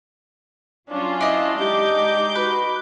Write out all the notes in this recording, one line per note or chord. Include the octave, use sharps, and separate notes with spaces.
F#3 C#4 D4 F4
D4 E4 D#5
G#3 D#4 G4 D6 G6
F#4 B4